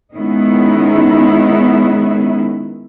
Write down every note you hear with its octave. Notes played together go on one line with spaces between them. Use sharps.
D#3 G#3 B3 C#4 D#4 E4